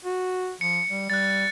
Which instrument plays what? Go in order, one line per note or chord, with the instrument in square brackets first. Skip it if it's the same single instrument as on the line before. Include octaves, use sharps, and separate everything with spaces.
[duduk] F#4
[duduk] F3 [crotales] C#7
[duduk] G3
[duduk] G3 [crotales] F#6 A6